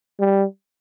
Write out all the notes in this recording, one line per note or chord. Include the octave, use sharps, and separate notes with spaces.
G3